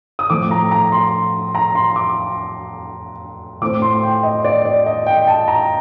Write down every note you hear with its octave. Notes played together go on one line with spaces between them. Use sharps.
D#6
A2 F3 A3 C4 D6
A#5
A#5
C6
A#5
C6
D6
A2 A3 C4 D6
C6
G5
D#5
D5
D5
D#5
G5
A5
A#5